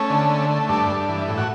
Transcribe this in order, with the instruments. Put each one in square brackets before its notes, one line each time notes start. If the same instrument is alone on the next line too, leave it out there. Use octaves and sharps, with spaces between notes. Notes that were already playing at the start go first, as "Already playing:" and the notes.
Already playing: [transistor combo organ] A3 C#4
D3
A3
A3
G2 D4
G2
E3
A2
F#4